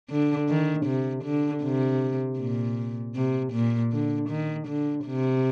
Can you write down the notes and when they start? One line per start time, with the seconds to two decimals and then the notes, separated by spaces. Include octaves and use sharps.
0.10 D3
0.49 D#3
0.86 C3
1.24 D3
1.63 C3
2.39 A#2
3.15 C3
3.53 A#2
3.92 D3
4.30 D#3
4.68 D3
5.06 C3